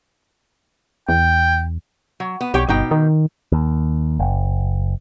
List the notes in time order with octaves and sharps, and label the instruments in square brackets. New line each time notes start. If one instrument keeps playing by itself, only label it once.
[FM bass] E2 [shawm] G5
[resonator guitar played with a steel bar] F#3
B3
[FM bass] B1 [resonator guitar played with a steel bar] G4 C#5 G5
[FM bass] G1 [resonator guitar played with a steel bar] B2 D#4 G5
[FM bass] D#3
[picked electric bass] D#2
F#1